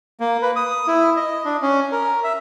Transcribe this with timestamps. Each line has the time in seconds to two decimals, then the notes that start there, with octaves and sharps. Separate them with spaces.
0.20 A#3
0.42 B4
0.56 D#6
0.87 E4
1.16 D#5
1.45 D4
1.62 C#4
1.92 A#4
2.24 E5